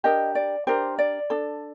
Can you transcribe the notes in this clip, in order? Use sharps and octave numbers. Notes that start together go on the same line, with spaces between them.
D4 G4 A#4 D#5
D5
D4 G4 A#4 C5
D5
D4 A4